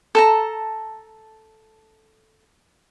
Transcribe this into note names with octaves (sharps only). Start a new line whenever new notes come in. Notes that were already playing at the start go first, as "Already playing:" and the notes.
A4 A5 A#5